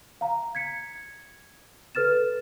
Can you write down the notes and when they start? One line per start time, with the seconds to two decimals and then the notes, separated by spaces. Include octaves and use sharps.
0.21 F5 A#5
0.55 G#6 B6 C#7
1.95 A4 B4 F6 A6 E7